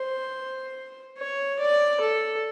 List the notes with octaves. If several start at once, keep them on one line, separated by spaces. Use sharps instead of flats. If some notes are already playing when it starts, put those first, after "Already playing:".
Already playing: C5
C#5
D5
A4